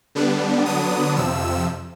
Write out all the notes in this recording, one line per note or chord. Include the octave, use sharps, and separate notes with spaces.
D3 G3 B3 D4
D3 F#3 B3 D4 D#6
F2 C3 F3 E6